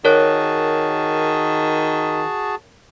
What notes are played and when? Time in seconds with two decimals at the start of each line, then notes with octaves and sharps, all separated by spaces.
0.05 D#3 F#4 G#4 A#4 C#5 A5 F#6